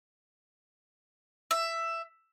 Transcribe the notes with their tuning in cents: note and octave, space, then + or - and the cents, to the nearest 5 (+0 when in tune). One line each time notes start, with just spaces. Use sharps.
E5 +10